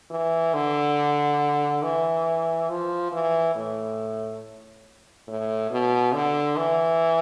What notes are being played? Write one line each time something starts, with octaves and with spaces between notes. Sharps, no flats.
E3
D3
E3
F3
E3
A2
A2
B2
D3
E3